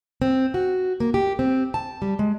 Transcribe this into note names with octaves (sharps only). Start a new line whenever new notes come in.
C4
F#4
A#3
G4
C4
A5
G3
G#3